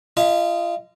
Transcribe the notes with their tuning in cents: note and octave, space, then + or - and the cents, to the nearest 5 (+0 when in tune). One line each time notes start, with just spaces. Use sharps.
F4 -30 D#5 +0 A5 +25